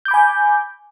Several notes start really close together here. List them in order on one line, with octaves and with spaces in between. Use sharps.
G6 D6 B5 G#5